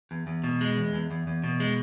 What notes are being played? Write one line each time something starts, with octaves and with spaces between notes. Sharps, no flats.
E2
E2
B2
G#3
E2
E2
E2
E2
B2
G#3